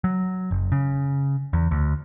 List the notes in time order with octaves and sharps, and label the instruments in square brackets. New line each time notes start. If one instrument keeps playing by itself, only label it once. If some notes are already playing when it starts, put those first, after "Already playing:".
[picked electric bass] F#3
F#1
C#3
E2
D2